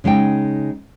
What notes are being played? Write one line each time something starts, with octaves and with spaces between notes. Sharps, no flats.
C#3 G#3 D#4 G5